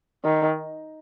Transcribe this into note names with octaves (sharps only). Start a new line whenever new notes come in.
D#3